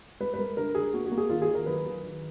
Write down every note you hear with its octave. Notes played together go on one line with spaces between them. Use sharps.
G#3 B4
B4
G#3 A#4
D3 A#4
D3 G#4
A#3 F#4
F#4
A#3
G#4
D#3 F4
G#4
D#3
A#4
F#3 B4
D#3
D#3